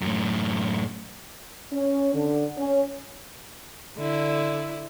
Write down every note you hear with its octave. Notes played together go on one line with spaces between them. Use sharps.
F#2 A2
C#4
D3
C#4
D3 E4